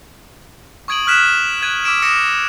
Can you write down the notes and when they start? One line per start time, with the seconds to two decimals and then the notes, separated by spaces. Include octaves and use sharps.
0.88 C#6 D#6 G#6 D7 D#7 F#7
1.06 C#6 D#6 F6 F#6 B6 E7
1.62 F#6 G#6 D#7
1.84 D6 E6 B6 D7 E7
2.03 D6 D#6 F6 A#6 C#7 E7